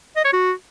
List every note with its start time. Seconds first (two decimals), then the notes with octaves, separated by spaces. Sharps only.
0.16 D#5
0.25 C#5
0.33 F#4